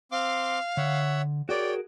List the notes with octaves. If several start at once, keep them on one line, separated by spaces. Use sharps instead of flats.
C4 F5 C6 D6
D3 C#5 E5 F#5
F#4 G#4 A#4 C#5 D5 G5